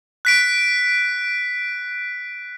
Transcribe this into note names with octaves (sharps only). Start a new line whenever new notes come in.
F#6 B6 D7